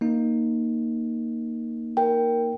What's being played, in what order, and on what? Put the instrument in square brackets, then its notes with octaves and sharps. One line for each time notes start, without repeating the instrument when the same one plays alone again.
[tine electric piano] A#3 D#4
[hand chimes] A#4 G5